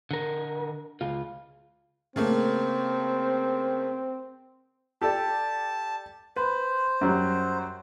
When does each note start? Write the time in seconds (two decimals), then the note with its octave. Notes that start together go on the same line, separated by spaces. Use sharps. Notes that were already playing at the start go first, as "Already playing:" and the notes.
0.11 D3 A#4
1.01 C#2 F4
2.16 C#3 A3 A#3 C4
5.01 G4 A4 D5 A5
6.36 B4 C5
7.01 F#2 F#3 G3